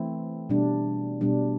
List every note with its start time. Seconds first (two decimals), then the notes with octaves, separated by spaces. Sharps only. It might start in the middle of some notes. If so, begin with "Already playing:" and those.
Already playing: E3 A3 C4 E4
0.50 B2 G3 D4
1.21 B2 G3 D4